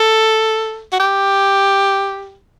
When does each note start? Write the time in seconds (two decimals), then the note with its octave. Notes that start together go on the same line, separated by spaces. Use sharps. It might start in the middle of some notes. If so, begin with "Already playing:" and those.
Already playing: A4
0.92 F#4
1.00 G4